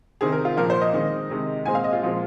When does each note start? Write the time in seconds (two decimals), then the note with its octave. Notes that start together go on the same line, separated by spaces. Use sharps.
0.21 C3 D#3 C4 G#4
0.32 A#4
0.45 F4
0.57 A#2 F3 A#3 A#4
0.70 C5
0.81 D#5
0.94 D#3 G#3 C4
1.30 C3 D#3 G#3
1.66 A#2 G#3 C4 G#5
1.75 F5
1.84 D#5
1.93 F4
2.03 A#2 F3 G#3 C4